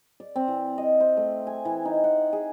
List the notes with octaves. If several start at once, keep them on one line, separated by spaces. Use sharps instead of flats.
D5
C4
E3
D#5
C5
A3
G#5
E3
D#4
F#5
G#4